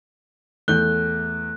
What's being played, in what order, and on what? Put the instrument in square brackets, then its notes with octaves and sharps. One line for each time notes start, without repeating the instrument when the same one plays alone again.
[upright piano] E2 G6 G7 [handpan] A3 [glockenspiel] F#6